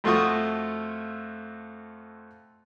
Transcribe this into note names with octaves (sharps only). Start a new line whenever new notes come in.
F2 A3 F4 F#4 C#6 D#6